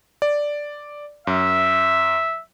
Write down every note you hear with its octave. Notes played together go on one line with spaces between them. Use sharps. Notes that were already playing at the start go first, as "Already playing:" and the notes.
D5
F#2 E5